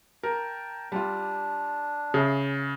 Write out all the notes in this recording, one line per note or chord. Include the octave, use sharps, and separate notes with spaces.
A#4 G5 A5
G3 D4 F4
C#3 G#4 E5